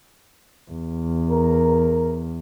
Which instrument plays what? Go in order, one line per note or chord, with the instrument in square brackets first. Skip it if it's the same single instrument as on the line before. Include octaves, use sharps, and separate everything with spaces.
[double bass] E2
[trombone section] A#4